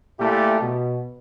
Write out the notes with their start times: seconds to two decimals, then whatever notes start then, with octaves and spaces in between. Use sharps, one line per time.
0.19 A#2 A3 E4 G4
0.60 B2